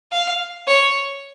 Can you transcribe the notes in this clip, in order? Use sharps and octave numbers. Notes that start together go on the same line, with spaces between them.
F5
C#5